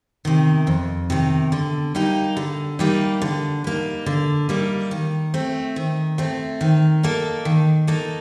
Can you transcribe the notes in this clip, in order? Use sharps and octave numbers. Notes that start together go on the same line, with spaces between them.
C3 D#3
F2
C3 D#3
D3
G3 A#3 D#4 G4
D3
G3 A#3 D#4 G4
D3
G3 A#3 D#4
D3
G3 A#3 D#4
D#3
A3 C4
D#3
A3 C4
D#3
A#3 D#4 A4
D#3
A#3 D#4 A4